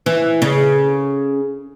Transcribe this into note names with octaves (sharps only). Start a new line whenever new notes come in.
E3
C#3